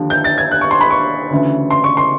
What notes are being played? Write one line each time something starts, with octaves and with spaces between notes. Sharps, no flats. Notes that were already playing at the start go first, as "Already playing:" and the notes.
Already playing: D#2 D3 F3
G6
A6
G#6
F#6
C#6
C6
B5
C#6
D2 C#3 E3
C6
C#6
C6